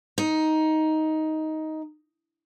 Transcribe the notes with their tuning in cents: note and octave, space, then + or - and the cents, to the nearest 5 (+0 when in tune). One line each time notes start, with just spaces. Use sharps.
D#4 +10